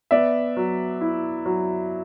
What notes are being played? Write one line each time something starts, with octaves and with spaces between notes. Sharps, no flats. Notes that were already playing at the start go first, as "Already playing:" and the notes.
B3 D5 E5
F#3
E4
F#3